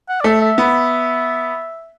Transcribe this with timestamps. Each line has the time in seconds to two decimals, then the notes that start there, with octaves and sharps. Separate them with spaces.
0.09 F#5
0.21 D5
0.24 A3 E5
0.41 E5
0.58 B3